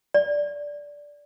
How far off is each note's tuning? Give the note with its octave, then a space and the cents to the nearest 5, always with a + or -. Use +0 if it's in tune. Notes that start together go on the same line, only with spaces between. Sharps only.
D5 -10